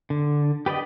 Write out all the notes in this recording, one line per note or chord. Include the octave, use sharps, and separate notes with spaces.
D3
G4 B4 D5 D#5